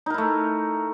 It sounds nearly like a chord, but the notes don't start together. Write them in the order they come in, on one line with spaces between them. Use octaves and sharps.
D#4 A#4 E4 A3